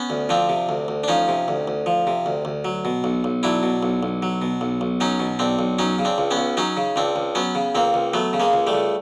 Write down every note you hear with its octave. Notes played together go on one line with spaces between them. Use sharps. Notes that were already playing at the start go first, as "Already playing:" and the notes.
Already playing: B3 C#4
D2
F3 C4 D4
C3
D2
D2
D4
F3 C#4 D#4
C3
D2
D2
F3
C3
D2
D2
F#3
B2
B1
B1
F#3 D4 E4
B2
B1
B1
F#3
B2
B1
B1
F#3 C#4 D#4
B2
B1 C4 D4
B1
F#3 C#4 D#4
C#3
C4 D4
C#2
B3 C#4
C#2
F#3 C#4 D#4
C#3
C#2 C4 D4
C#2
F#3 B3 C#4
C#3
C#2 A#3 C4
C#2
F#3 A3 B3
C#3
G#3 A#3
C#2
G3 A3
C#2